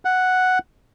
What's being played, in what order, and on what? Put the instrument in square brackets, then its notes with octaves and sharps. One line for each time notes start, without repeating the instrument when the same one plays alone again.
[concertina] F#5